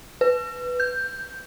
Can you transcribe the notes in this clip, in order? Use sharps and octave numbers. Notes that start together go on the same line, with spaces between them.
B4
G6